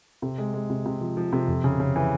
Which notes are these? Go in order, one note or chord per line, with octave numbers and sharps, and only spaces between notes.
C3
G#3
G#3
C3
C3
F3
F3
C3
F2
C#3
C#3
E3